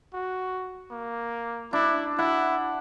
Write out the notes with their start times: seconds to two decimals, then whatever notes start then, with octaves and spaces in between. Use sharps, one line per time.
0.14 F#4
0.91 A#3
1.73 D4 E4
2.18 E4 F#5